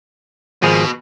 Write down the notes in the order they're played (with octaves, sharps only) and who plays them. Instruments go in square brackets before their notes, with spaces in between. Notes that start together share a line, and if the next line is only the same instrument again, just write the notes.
[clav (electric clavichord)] G#1 F3 G#4 [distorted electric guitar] B2